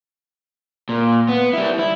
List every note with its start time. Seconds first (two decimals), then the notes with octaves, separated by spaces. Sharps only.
0.89 A#2
1.29 B3
1.53 G3 E4
1.79 E4